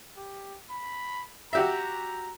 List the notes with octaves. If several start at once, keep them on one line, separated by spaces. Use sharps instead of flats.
G4
B5
F#4 G4 E5 A#5